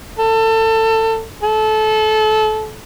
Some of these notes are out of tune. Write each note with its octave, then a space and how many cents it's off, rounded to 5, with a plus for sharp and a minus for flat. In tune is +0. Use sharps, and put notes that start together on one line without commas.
A4 +25
A4 -25